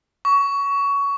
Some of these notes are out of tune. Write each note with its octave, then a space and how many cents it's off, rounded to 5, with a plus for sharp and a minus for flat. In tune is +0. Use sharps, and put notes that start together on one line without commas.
C#6 +20